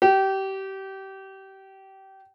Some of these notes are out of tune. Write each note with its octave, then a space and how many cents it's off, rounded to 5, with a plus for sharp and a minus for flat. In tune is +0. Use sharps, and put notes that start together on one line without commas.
G4 -25